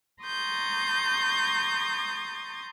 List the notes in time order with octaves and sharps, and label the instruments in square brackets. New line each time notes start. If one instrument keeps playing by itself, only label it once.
[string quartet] A#5 C6 C#6 D#6 G6 A6